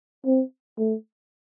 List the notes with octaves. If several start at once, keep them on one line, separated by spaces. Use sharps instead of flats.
C4
A3